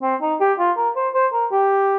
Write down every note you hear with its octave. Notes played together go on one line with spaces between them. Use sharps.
C4
D#4
G4
F4
A#4
C5
C5
A#4
G4